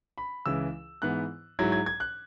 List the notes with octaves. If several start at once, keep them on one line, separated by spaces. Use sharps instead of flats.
B5
C#2 C#3 E3 E6
G#2 E3 B3 F#6
G#2 F#3 E4 G#6
G#6
G#6
F#6